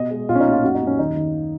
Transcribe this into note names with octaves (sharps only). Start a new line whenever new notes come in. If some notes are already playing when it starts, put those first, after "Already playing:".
Already playing: B2 D#5
G#3
B1 F4
C#4
D#4
A#2
F4
F#2 F#4
D#4
F#2 C#4
D#2 D#4
D#3